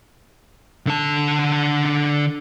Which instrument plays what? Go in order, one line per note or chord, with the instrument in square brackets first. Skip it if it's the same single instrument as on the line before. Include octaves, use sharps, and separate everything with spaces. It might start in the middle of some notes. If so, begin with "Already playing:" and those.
[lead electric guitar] D3 A5